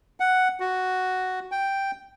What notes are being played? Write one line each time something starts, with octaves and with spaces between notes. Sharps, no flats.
F#5
F#4
G5